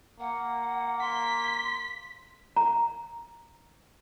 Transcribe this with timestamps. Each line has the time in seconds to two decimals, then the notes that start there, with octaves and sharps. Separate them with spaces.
0.20 A#3 F#5
1.01 C6 B6
2.56 A#5